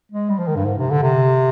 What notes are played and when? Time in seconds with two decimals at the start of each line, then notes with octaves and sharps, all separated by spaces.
0.11 G#3
0.30 G3
0.38 F3
0.47 D#3
0.56 G2
0.65 G#2
0.78 C3
0.90 D3
1.02 C3